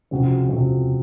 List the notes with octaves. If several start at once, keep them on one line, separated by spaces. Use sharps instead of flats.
C#2 C3 F3 C4 F#4
C#2 C3 F3 C4 F#4